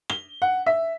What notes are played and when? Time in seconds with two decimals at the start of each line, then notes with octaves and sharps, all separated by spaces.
0.10 G7
0.42 F#5
0.66 E5